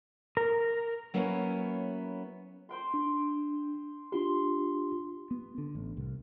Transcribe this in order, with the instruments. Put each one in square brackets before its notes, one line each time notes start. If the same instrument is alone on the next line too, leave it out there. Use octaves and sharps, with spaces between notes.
[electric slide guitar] A#4
[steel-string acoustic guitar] F#3 A#3 B3 C#4 E4 C#5
[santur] C5 G5 C6
[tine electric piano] D4
[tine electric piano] D4 F4 G4 [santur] C6
[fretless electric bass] B3
D3
A1
C2